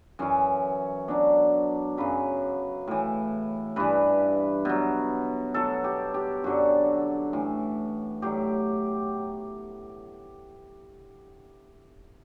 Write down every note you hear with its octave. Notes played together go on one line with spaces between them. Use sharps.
F#2 E3 C#4
B2 F#3 D4
F#2 C#3 F#3 B4
A2 E3
G2 E3 B4
B2 F#3
B2 F#3 A4
G4
G4
F#2 D3 F#3 F#4
A2 E3
A2 F#3 G4